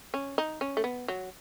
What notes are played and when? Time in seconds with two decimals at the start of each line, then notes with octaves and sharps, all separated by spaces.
0.14 C#4
0.38 D#4
0.61 C#4
0.77 A3
0.84 B3
1.08 F#3